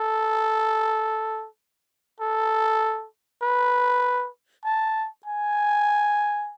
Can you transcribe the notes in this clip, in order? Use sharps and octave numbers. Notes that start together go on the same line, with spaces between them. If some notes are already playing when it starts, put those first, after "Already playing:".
Already playing: A4
A4
B4
A5
G#5